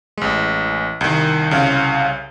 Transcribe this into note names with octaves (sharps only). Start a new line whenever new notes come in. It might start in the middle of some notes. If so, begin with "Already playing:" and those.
A1 G#3
C2 D#3
C2 C#3 F5